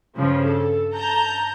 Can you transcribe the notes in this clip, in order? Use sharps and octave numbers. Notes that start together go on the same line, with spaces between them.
G2 C#3 F3
A4
A5 A#5 G6